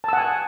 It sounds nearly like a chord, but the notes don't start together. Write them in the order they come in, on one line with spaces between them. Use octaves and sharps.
A5 E6 F#5 G#5